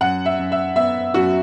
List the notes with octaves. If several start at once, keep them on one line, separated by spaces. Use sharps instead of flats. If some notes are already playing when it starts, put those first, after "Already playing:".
F#2 F#5
E5
F#2
E5
B3 E5
F#2 F#4